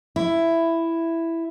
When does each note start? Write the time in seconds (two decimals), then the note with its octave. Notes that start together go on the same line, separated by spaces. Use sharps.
0.16 E4